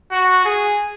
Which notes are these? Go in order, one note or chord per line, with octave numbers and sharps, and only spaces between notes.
F#4
G#4